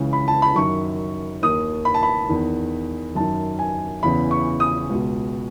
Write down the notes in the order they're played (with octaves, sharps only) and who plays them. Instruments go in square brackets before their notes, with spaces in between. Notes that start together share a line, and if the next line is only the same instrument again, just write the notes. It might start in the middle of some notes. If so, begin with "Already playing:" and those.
Already playing: [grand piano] C#2 C#3 E3
B5
A5
B5
F#2 D#3 C#6
D#2 D#3 D#6
B5
A5
B5
E2 D#3
F#2 D#3 A5
G#5
E2 C#3 E3 B5
C#6
D#6
C#2 B2